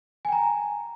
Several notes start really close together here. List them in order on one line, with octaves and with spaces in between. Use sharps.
G#5 G5 A#5